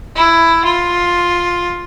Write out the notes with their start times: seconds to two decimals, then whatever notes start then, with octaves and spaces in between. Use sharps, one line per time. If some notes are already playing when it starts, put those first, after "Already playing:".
0.16 E4
0.65 F4